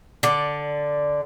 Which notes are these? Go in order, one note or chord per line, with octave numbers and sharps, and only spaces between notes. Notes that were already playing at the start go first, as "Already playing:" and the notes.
D3 D5